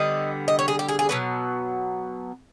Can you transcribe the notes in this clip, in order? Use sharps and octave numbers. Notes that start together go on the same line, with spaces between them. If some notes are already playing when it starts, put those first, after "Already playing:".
Already playing: D3 G3 B3 D#5
D#5
C#5
G#4
G4
G#4
G#4
B2 F#3 B3 B4